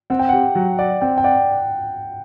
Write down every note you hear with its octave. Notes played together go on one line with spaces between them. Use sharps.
C4 F#5
G5
G4 F#5
F#3
D5 F#5
C4 G5
G5
D5 F#5